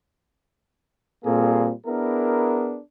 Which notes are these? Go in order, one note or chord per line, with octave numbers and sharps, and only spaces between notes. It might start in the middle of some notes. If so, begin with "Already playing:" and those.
A#2 G3 A#3 C4 G#4 A4
B3 D4 E4 G#4 A#4